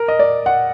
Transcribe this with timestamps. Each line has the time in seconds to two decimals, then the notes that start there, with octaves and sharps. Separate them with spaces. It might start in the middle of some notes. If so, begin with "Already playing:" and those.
Already playing: A#4
0.08 D#5
0.19 D5
0.46 F#5